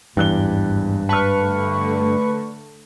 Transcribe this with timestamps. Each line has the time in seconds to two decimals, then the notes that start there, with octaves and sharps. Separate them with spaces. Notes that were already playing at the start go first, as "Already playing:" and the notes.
0.17 G#1 E2 G2 F#6 G7
1.09 B4 A5 C#6 F6
1.40 D3 A3